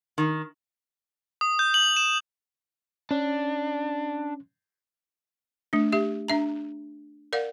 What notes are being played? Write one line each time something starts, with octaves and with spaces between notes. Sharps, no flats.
D#3
D#6
G6
F#7
E7
C#4 D4
A3 D4
G4 E5
D4 E5 A#5
A#4 D5 F5 F#5